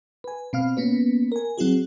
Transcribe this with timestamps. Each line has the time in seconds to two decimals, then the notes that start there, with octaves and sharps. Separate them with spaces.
0.24 B4 G#5
0.53 B2 C4 F5 F6
0.77 A#3 B3 C#4 B4
1.32 A#4 G#5
1.58 F#3 C4 E4 F#4 G#4